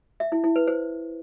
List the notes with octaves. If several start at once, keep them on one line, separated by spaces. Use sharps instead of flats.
E5
E4
E4
B4
C5